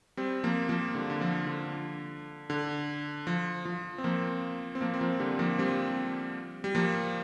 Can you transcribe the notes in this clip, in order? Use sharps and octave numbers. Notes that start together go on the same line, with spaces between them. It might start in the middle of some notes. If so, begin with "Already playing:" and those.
G3 C4
F3 A#3
F3 A#3
D3 G3
D3
F3
D3
D3
F3
F3
C4
F3 A#3
C4
F3 A#3
C4
F3 A#3
D3 G3
F3 A#3
G3 C4
G3
F3 A#3